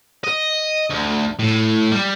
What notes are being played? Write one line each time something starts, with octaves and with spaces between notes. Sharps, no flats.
D#5
D2
A2
G3